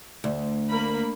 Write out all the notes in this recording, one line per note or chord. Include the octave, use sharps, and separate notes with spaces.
D2
A#3 A#4 B5